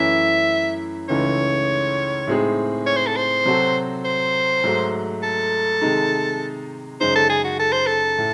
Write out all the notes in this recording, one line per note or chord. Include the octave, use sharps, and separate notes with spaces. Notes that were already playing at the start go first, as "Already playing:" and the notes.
Already playing: F#2 E3 A3 C#4 E4 E5
C#2 C#3 E3 A3 D#4 C#5
A2 G#3 C4 D#4 G#4
C#5
C5
A4
C5
C3 F#3 C4 F#4 A4
C5
G#2 F#3 A3
A4
C3 D#3 G#3 D#4
F#2 C#3 G#3 D#4 C5
A4
G#4
F#4
A4
C5
A4
A2